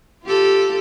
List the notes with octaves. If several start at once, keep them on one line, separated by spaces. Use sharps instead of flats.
F4 G4 A4